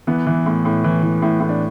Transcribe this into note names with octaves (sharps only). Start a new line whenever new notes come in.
E3 B3
E3
A2
A2
E3
E3
A2
A2
D4